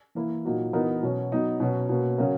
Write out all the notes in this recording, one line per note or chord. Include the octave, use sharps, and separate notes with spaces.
E3 A#3 E4 A#4
A#2 F#3 A#3 D#4 F#4
E3 B3 D#4 F#4 A#4
B2 F#3 C#4 F#4
F#3 B3 D#4
B2 F#3 C#4 F#4
B2 A#3 C#4
C#3 F#3 C#4 F#4 A#4